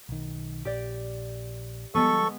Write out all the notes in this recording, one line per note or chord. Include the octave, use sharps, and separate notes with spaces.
B1 D#3
A#1 G4 D5
F3 G3 G#3 B3 A4 C#6